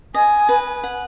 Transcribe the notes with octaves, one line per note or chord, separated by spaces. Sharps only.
D#5 G#5
B4
F#5